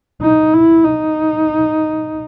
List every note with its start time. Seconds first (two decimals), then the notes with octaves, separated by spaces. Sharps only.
0.22 D#4
0.54 E4
0.84 D#4